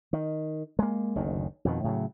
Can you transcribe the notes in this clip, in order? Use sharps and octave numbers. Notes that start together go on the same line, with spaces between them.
D#3
G#3 A#3
F#1 D2 D#3
F2 B2 D#3
A2 C#3 F#3